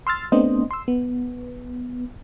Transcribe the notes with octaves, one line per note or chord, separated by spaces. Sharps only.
C6 E6 F6 A6
A3 B3 C4 D4 C5 D#5
C6 E6
B3